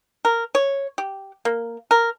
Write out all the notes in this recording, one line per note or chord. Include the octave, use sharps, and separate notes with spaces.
A#4
C#5
G4
A#3
A#4